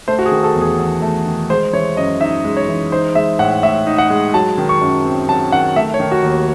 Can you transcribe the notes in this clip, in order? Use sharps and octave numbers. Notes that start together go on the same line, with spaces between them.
A3 C5
F#4
G#4
D#3
A4
E2
G#4
E2
A3
D#3
G#3 C5
E3 C#5
F#2 D#5
D#4 E5
G#3
C#5
E3
D#4 C5
G#3 E5
A2 F#5
A2 E5
D#4
F#5
G#3
F#3 A5
D#3
C#6
F#2
C4
F#3 A5
D#3 F#5
A3 E5
C#5
D#3
F#4
D#2